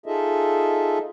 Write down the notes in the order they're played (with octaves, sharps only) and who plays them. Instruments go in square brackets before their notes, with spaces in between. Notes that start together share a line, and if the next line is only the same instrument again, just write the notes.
[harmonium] D#4 F4 G#4 A4 D#5 E5